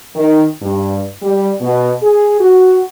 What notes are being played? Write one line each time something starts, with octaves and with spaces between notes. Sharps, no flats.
D#3
G2
G3
B2
G#4
F#4